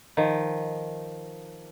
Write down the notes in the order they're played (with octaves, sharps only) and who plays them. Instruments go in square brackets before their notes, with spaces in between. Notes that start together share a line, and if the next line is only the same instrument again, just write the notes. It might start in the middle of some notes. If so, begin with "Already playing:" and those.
[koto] D#3 F3